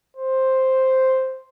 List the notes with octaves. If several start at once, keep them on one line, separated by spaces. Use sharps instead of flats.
C5